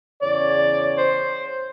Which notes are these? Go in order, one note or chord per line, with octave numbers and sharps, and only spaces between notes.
E2 C#3 C#5 D5
C5